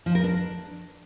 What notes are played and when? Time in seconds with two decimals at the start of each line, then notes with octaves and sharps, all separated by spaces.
0.06 F3
0.15 A#4
0.24 D4